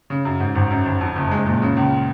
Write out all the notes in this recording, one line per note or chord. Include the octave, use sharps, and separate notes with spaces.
C#3
F#2
G#2
G#1
F#2
G#1
F2
F#1
G#3
A#2
C#3
C#2